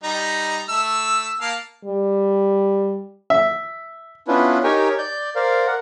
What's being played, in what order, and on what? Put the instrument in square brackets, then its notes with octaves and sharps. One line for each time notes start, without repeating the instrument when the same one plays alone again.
[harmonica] G3 D#4 A#5
A3 E6
A#3 F5 A5
[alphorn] G3
[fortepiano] E5
[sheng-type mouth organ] B3 C#4 D4 E4 F4 B4
D#4 G4 A#4 C#5 G5 G#5
D5 G6
A#4 C5 D5 F5
A#4 F#5